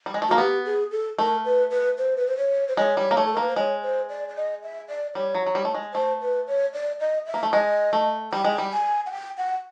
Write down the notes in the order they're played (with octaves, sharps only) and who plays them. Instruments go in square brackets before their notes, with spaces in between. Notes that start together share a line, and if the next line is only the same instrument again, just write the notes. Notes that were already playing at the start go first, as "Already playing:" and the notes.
[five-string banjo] G3
G#3
A3
[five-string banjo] A#3 [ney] F#4
[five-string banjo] B3 [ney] G4
[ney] G#4
A4
[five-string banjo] A3 [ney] A#4
[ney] B4
B4
C5
B4
C5
C#5
C5
[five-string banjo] G#3 [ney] C#5
[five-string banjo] G3
A#3
A3
[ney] A4
A#4
[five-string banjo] A#3 [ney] B4
[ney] C5
[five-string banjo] G#3 [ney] C#5
[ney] C5
D5
D5
D#5
E5
D5
[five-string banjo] G3 [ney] C#5
[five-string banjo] F#3
F#3
G3
A3
G#3
[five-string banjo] A3 [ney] C5
[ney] B4
C#5
D5
D#5
E5
[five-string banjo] A#3
A3
[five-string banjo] G#3 [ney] D#5
[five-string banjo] A3
[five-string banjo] G3 [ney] G5
[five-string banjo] G#3
G3
[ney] G#5
F#5
G5
F#5